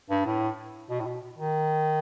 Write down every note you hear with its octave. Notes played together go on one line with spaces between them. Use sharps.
G2
A2
B2
A2
B2
D#3